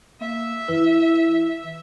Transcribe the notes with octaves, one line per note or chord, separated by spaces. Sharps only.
A#3 E5
E3 E4 B4